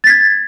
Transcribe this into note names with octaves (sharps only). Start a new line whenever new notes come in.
G#6 A6 B6